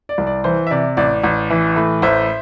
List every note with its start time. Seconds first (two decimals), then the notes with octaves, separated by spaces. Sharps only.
0.09 D5
0.18 C2
0.27 D5
0.44 E3 C5
0.67 E5
0.71 C3 D5
0.97 A1 D5
1.23 A1
1.50 E3
1.76 A2
2.02 A1 C5 E5